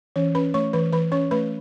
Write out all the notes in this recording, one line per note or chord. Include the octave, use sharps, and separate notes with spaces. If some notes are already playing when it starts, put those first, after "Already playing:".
E3 C#4 C#5
C#4 B4 B5
A3 C#5 C#6
E3 B4 B5
E3 B4 B5
C#4 C#5 C#6
A3 B4 B5